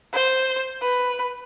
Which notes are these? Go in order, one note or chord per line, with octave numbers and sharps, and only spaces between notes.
C5
B4